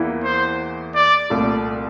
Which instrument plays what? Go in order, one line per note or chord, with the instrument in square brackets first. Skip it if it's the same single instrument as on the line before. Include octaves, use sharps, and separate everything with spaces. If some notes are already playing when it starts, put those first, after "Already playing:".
Already playing: [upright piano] E2 E3 A#3 E4
[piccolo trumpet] C5
D5
[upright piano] C2 A#2 A3